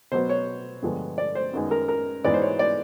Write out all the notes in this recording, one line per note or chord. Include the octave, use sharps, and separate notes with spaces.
B2 F#3 B3 C5
C#5
G2 D3 F3 G#3 B3
D5
C5
F#2 D#3 G#3 B3
A#4
A#4
G#2 E3 G#3 B3 D5
C5
C#5
D5